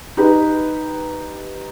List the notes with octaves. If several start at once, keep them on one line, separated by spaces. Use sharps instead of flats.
D#4 G4 B4